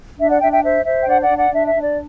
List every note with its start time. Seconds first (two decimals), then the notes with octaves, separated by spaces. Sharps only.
0.18 D4 E5
0.30 D5 F#5
0.40 D4 E5 G5
0.51 E5 G5
0.63 C5 E5
0.85 C5 E5
1.01 G5
1.07 D4 D5 F#5
1.22 D5 F#5
1.30 D4
1.37 D5 F#5
1.52 D4 E5
1.67 E5
1.74 D4
1.82 D5